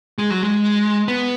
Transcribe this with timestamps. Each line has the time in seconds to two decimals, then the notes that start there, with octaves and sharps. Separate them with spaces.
0.18 G#3
0.30 F#3
0.43 G#3
1.08 B3